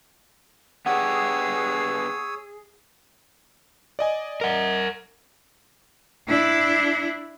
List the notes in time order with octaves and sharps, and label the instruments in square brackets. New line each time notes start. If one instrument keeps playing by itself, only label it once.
[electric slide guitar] B3 D4 G4 [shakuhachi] G#4 [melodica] C#5 D#6 E6 [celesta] F#5
[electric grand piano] D5 D#5 G#5
[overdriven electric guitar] A#4 F#5
[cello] D4 E4